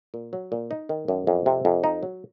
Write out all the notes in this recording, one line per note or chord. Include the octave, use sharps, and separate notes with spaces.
A#2
F#3
A#2
D#4
D#3
F#2
F2
C3
F2
D#4
F#3